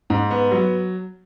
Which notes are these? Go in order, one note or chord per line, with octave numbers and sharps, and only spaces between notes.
G#2
B3
F#3